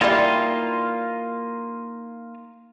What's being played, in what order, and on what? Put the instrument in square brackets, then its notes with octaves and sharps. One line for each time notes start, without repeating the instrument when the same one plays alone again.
[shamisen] E3 G3 [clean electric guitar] A#3 D#4 F4